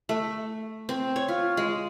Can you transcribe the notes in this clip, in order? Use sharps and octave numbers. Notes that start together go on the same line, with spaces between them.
A3
C4
C#5
F4
G#3